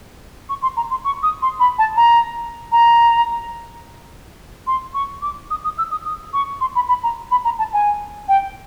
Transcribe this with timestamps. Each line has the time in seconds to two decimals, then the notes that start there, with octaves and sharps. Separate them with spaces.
0.49 C#6
0.62 C6
0.77 A#5
0.91 C6
1.05 C#6
1.23 D#6
1.42 C6
1.60 B5
1.79 A5
1.97 A#5
2.72 A#5
4.67 C6
4.94 C#6
5.22 D6
5.51 D#6
5.64 D#6
5.78 E6
5.91 D#6
6.05 D#6
6.33 C#6
6.61 C6
6.75 B5
6.89 B5
7.03 A#5
7.31 B5
7.45 A#5
7.59 A5
7.73 G#5
8.29 G5